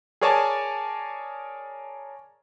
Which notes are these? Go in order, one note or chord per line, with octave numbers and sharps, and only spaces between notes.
G#4 A#4 C#5 D5 G#5 A5